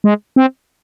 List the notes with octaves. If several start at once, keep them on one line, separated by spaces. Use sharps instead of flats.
G#3
C4